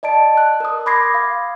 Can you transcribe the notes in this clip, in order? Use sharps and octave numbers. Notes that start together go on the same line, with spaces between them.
D5 D#5 A5 D7
F#6
A#4 D#6
B5 C6 D6 G#6 A#6 C7
F5